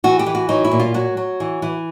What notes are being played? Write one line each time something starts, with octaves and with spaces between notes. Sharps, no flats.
E3 F#4
G4
E3
F#4
F#3 D#4
E4
A#2
F4
F#3 F#4
F#3
E3
E3